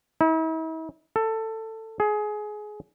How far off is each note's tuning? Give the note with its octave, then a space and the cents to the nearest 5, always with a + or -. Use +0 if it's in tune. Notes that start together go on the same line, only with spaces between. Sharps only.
E4 -45
A4 +15
G#4 +20